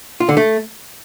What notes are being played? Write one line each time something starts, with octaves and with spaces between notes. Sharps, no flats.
F4
D3
A3